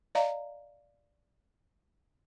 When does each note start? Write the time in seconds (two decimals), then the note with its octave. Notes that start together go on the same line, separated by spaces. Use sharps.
0.15 D5 D#5 F5 A#5